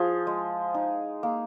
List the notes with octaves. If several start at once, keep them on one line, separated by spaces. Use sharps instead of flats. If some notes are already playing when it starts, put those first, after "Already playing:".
Already playing: F3 G#4
G#3
D#4
A#3